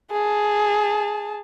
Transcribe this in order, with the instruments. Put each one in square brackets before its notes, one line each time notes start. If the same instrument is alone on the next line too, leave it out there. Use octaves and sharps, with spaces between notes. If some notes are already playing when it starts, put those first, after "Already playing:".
[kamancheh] G#4 A5